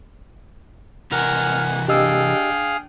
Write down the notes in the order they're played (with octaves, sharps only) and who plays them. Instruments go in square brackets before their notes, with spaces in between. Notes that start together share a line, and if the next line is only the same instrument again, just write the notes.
[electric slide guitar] C3 E3 A#4 [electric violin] F#5 G#5 [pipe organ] F6
[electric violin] D4 G5 [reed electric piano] G4 D#5 E6 [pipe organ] G#4 F5